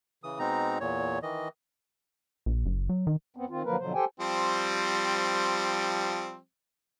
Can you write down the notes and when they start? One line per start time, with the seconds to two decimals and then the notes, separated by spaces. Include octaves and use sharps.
0.23 C#3 E3 D#6
0.39 B2 G#3 C4 D#4 A#5
0.80 E2 A#2 C#5
1.22 D#3 E3 D#5
2.46 A#1
2.66 F#1
2.89 F#3
3.07 D#3
3.36 F2 B3 C4
3.49 D#3 C4 F4
3.64 D3 F3 F#3 A#3 A#4 B4
3.79 B2 D3 F3 F#3 C5
3.94 G4 A4 C5 G5 G#5
4.20 F3 G3 C4